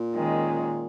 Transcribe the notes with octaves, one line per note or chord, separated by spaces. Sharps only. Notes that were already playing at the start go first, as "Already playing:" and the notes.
Already playing: A#2
D#3 G#3 C#4